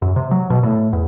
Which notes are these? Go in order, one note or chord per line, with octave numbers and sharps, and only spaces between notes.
F#2
C3
F#3
B2
A2
E2